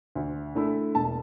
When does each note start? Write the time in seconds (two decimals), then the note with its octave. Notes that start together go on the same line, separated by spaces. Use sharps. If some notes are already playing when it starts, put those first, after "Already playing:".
0.15 D2
0.55 D3 A3 E4
0.95 E1 A5